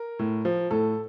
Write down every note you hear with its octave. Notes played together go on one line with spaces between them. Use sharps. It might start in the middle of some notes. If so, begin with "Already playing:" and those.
Already playing: A#4
A2
F3
A2 A4